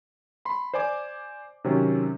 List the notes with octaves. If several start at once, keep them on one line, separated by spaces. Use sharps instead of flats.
B5 C6
C5 D5 G#5 D6
C3 D#3 F#3 C4 C#4